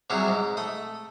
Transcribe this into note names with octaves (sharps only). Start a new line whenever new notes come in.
C3 F#3 G3 E4 G#4
G#2
A3 D#6